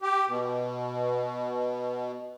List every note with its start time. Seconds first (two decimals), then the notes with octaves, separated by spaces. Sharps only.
0.02 G4
0.28 B2